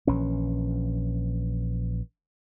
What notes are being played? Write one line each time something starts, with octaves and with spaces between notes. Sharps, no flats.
A#1 E3 C#4